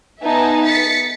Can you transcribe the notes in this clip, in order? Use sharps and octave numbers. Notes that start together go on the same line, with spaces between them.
B3 D#4 E5 G#5 A5
A6 B6 C#7